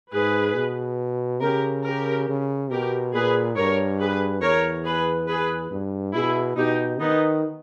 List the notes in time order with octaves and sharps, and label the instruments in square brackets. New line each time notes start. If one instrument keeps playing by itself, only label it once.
[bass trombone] G#2 [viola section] G#4 B4
[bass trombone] B2
[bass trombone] C#3 [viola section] G4 A#4
[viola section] G4 A#4
[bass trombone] C#3
[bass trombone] B2 [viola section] G4 A#4
[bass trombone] A#2 [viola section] G#4 B4
[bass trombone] G2 [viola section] A#4 C#5
[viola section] G#4 B4
[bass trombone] E2 [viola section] A#4 C#5
[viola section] G#4 B4
G#4 B4
[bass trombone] G2
[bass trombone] B2 [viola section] E4 G#4
[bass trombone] B2 [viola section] D#4 G4
[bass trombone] D#3 [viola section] B3 D#4